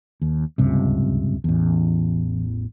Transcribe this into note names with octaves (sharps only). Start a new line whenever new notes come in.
D#2
D1 C#2 G2 C3
A1 E2